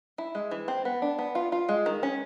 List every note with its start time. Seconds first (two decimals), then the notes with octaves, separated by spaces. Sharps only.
0.18 E4
0.35 G#3
0.51 E3
0.68 C4
0.85 B3
1.02 D4
1.19 B3
1.35 F4
1.52 F4
1.69 G#3
1.86 D#3
2.03 C#4